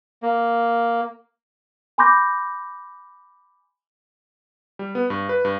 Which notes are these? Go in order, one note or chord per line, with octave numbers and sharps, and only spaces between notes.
A#3
G#5 B5 C6 D6 G6 A#6
G3
B3
G2
B4
G2